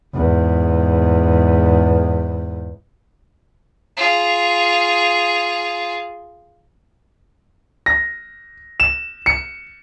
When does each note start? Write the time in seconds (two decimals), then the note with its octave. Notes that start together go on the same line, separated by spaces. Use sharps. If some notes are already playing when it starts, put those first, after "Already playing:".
0.14 E2 G#2
3.97 F4 G#4
7.86 A#6
8.80 E7
9.26 C#7